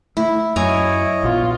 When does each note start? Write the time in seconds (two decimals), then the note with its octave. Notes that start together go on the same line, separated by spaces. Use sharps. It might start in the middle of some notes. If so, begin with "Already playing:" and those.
0.17 A3 E4
0.56 F#2 E4 C#5 D#5 G#5 A#5
1.23 A#1 C#3 B3 F4